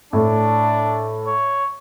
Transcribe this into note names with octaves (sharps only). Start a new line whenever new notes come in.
A2 D4
C#5